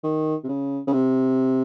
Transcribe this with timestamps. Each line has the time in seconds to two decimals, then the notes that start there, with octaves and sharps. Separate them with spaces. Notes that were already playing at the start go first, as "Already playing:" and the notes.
0.04 D#3
0.44 C3
0.49 C#3
0.87 C#3
0.93 C3